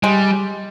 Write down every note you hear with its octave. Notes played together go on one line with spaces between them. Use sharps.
G3 G#3